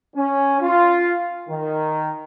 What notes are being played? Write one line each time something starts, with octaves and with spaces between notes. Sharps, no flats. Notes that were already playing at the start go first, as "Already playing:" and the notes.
C#4
F4
D#3